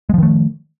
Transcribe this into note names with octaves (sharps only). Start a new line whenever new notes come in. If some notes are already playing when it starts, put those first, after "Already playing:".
D#3 F3 G#3 A3